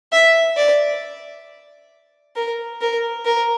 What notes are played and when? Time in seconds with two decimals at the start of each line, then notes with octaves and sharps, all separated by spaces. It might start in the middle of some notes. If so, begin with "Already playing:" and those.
0.13 E5
0.57 D5
2.36 A#4
2.81 A#4
3.25 A#4